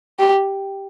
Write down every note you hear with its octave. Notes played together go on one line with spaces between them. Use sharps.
G4